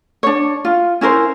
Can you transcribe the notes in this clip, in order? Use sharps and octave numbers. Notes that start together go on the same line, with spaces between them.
D4 C#5
F4
C#4 E4 A#4 C5